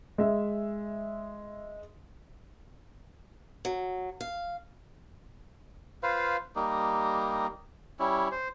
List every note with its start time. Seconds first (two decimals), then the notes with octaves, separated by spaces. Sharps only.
0.18 G#3 E5
3.65 F#3
4.21 F5
6.03 F4 B4 C5 F5
6.56 G3 A#3 D#4
7.99 G3 C#4 E4
8.32 C5